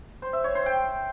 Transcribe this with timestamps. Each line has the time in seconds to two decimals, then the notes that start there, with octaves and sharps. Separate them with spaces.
0.22 C5
0.33 E5
0.44 C#5
0.55 C5
0.66 G5